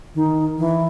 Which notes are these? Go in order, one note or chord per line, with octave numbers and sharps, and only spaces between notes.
D#3
E3